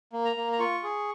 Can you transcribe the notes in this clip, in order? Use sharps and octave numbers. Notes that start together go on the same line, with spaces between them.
A#3
A#5
A#3
A#5
F4 C#6
G#4